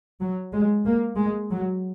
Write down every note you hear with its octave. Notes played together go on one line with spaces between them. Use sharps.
F#3
G#3
A#3
G#3
F#3